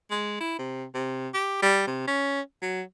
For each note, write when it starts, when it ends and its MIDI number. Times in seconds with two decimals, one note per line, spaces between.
0.10 0.36 56
0.40 0.59 64
0.59 0.86 48
0.94 1.29 48
1.34 1.62 67
1.63 1.86 55
1.87 2.04 48
2.07 2.41 61
2.62 2.82 54